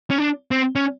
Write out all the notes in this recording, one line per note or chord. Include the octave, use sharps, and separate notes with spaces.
C#4
D4
C4
C#4